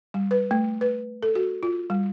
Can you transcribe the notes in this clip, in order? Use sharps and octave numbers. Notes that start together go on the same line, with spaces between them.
G3
B4
A3
B4
A4
F#4
F4
G3